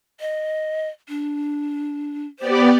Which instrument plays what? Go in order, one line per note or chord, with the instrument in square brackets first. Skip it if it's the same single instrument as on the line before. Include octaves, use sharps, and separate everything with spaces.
[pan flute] D#5
D4
[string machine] B3 G4 D5 [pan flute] C5